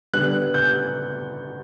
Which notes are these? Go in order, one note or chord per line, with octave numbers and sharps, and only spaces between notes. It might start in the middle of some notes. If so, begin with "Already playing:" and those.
D3 G3 B3 F#6
G6